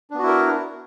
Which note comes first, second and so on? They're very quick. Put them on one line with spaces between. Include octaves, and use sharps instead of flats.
D4 B3 F#4 E4 A#4